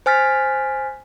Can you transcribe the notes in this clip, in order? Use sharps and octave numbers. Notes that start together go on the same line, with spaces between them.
C5 G#5 F6 A6 B6